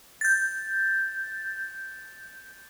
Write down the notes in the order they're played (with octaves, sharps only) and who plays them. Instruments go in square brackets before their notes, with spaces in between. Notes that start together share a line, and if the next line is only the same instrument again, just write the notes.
[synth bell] G6 A6